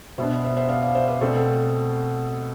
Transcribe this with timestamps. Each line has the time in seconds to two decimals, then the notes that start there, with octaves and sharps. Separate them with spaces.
0.18 B2 B3 D4 C5 E5
0.44 C5 E5
0.57 C5 E5
0.69 D5 F5
0.82 D5 F5
0.95 C5 E5
1.08 B4 D5
1.21 B2 A3 C4 A4 C5